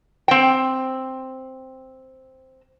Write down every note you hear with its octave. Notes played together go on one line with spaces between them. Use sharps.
C4 G5